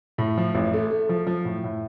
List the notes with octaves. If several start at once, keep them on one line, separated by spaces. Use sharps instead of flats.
A2
F3
A1
A3
A3
F3
F3
A2
A2